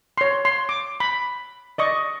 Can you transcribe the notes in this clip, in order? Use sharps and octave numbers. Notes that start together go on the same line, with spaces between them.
C#5 C6
C6
D6
B5
D5 D#5 C#6